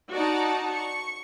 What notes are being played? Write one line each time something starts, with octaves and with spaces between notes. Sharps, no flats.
D#4 F#4 D5 F#5 A5 A#5
C#6